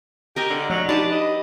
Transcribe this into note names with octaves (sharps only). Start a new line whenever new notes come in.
G4 A#4 D#5 G#5
D3
F3 F#3 D5
D4 D#4 G4 B4 A5
D#5